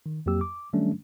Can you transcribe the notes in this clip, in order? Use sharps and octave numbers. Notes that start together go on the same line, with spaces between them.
D#3
F2 F#3 A#3 G4 E6
D6
D#3 F#3 G3 A3 C#4 D4